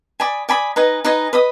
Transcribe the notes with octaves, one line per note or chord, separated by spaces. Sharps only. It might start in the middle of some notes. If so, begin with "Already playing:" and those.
D5 G#5 B5 D#6
D5 G#5 B5 D#6
D#4 B4 D#5 G#5
D#4 B4 D#5 G#5
B4 D#5 B5 D#6